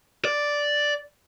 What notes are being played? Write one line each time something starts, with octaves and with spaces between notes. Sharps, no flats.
D5